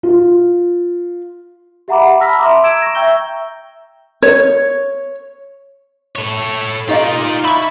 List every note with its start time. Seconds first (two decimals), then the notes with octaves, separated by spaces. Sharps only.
0.03 F4
1.88 G4 E5 F#5 A#5 B5 D6
2.20 A5 B5 E6 F6 A#6 B6
2.39 E5 A#5 C6 D6 D#6
2.63 E6 G#6 D7 E7
2.82 C#6 A#6
2.95 E5 G5 A#5 E6 G6 G7
4.22 C#5
6.16 A4 C#5
6.89 D#4 F4 G4 D5 D#5 F5
7.44 E4 B5 C#6